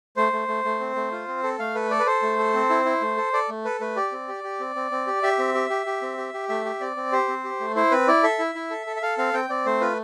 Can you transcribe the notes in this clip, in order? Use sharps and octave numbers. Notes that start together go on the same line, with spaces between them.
A3 C5
A3
A3
A3
C4
A3
F4
C4
A4
A3 F5
A4 B4
A4 D5
B4
A4 C5
A3
A4
C4
E4
E4
A3
A4
A4 D5
A3
A4 B4
A3 B4
G4 D5
C4
G4
G4
C4
C4
C4
G4
G4 E5
C4
G4
G4
G4
C4
G4
G4
A3 E5
G4
C4 D5
C4
G4 C5
C4
G4
A3
E4 C5
C4 B4
E4 D5
A4 E5
E4
E4
A4
A4
E5
A4 F5
C4 F5
C4 G5
C4 D5
A3 C5
F4 B4